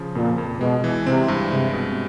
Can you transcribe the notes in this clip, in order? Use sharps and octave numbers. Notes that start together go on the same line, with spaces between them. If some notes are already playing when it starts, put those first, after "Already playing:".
Already playing: C#3 F3
F2 A#2
F2
B2 G#3
E3
C3 C4
G2
C3 G#3
B2